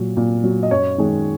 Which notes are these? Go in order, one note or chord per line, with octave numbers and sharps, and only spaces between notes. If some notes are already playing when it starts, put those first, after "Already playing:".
Already playing: A#2 F#3
A#2
F#3
D#5
F#2 C#5
D#3 G#3